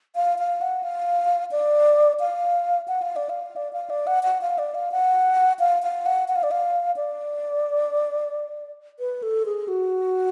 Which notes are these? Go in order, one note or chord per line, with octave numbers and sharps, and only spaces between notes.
F5
F5
F#5
F5
D5
F5
F#5
F5
D5
F5
D5
F5
D5
F#5
F#5
F5
D5
F5
F#5
F5
F5
F#5
F#5
F5
D5
F5
D5
B4
A4
G#4
F#4